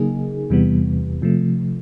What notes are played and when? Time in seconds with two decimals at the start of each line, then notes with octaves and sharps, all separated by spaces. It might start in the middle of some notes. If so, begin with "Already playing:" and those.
Already playing: C#3 F#3 A#3 D#4 G#4
0.50 E2 C3 E3 G3 B3
1.22 C3 F3 A3